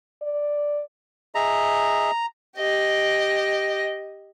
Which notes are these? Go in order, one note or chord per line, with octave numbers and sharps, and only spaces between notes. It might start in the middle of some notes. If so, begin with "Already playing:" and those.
D5
G#4 D#5 E5 A#5
G4 D#5